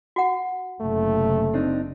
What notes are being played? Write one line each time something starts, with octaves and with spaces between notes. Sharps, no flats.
F#4 F#5
F#1 C3 A3
C4 D4 D#4